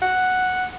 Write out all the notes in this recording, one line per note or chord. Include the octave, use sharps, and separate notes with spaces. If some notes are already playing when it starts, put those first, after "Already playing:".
F#5